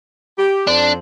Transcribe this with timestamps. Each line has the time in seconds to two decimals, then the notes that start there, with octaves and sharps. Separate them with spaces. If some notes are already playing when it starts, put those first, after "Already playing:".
0.38 G4
0.68 F2 F3 D4 C5